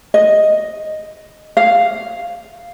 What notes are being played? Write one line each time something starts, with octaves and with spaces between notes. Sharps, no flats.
D#5
F5